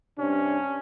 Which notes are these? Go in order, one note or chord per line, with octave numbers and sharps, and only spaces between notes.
G2 C3 C#4 D4